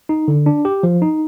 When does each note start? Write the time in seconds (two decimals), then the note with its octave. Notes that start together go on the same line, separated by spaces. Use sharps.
0.09 D#4
0.28 D3
0.46 D4
0.65 G4
0.83 F3
1.02 D#4